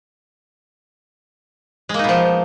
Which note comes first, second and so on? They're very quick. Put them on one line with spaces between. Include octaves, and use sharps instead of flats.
G#3 A#3 D#4 B2 F3